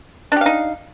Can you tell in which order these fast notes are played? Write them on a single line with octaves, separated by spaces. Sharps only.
D4 G4 F5 D#4